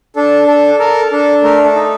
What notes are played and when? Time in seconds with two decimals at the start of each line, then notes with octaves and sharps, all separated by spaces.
0.16 D4 A4
0.48 A4
0.80 A4 A#4
1.11 D4 A4
1.43 A3 A#4
1.64 A4
1.75 D#4